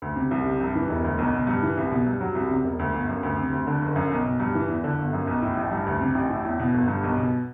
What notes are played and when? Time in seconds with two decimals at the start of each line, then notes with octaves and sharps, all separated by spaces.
0.02 D2
0.16 C3
0.31 C2
0.45 C3
0.61 G2
0.75 E3
0.89 E1
1.04 D2
1.18 B1
1.34 B2
1.47 G2
1.63 E3
1.77 C2
1.92 B2
2.06 G2
2.21 F#3
2.35 C2
2.51 C3
2.64 E1
2.79 D2
2.94 G1
3.08 F#2
3.23 D2
3.38 C3
3.52 D2
3.67 D3
3.82 F#1
3.96 F#2
4.11 B1
4.25 B2
4.40 G2
4.55 E3
4.69 E2
4.84 D3
4.98 G1
5.13 F#2
5.27 B1
5.42 A2
5.57 A1
5.72 G2
5.86 D2
6.00 C3
6.15 A1
6.30 A2
6.45 E2
6.59 B2
6.74 G1
6.88 G2
7.04 B1
7.18 B2